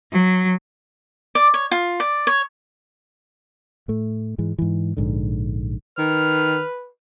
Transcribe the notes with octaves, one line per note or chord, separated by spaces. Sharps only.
F#3
D5
C#5
F4
D5
C#5
A2 A3
G#2 E3 G#3
G#2 E3
A#1 G#2 D3
D#3 B4 F6